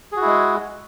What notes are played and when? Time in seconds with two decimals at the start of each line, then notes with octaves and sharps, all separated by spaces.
0.12 G#4
0.17 F#4
0.21 E4
0.26 G#3